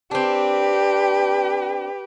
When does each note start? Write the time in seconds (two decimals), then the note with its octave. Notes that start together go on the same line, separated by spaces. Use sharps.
0.11 C4 D4 G4 B4